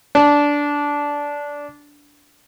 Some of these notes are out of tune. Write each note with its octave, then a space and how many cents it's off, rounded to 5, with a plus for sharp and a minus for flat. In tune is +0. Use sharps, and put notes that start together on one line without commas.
D4 -15